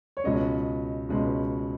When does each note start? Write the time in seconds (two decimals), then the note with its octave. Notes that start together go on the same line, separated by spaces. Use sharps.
0.17 C#5
0.24 C#2 B2 G#3 C#4 D#5
1.09 C#2 B2 G#3 C#4